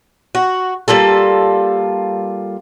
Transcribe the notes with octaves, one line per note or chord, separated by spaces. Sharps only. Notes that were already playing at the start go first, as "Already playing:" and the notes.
F#4
G3 A#3 F4 A4